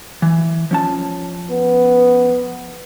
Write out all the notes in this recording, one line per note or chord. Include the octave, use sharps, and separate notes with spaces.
E3
F3 C#4 A5
B3